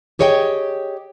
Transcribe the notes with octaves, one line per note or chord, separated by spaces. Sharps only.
G4 G#4 C#5 D#5 F#5 G5